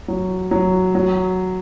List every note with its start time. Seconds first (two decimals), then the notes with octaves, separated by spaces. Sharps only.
0.08 F#3
0.51 F#3
0.95 F#3